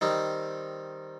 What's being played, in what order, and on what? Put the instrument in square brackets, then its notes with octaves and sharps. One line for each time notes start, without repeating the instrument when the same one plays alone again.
[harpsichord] D#3 G3 C4 D#4